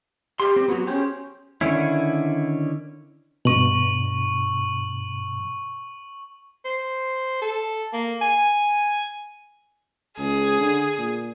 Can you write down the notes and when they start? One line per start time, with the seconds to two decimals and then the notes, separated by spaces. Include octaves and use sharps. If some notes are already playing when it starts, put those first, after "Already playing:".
0.40 G4 C6
0.56 C4
0.68 F#3 B3 F#4
0.87 C#4 G4 G#4 C5
1.61 D3 D#3 C#4 E4
3.45 G2 B2 C#6 F#7
6.65 C5
7.41 A4
7.93 A#3
8.21 G#5
10.18 C#2 G#4
10.60 D3
10.98 A#2